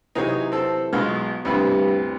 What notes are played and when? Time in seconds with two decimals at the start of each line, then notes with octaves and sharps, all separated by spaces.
0.15 C3 E3 F#3 D#4 G#4 C#5
0.52 C4 A4
0.93 B1 G#3 B3 F4 F#4 F6
1.45 D2 G2 C3 G3 E4 B5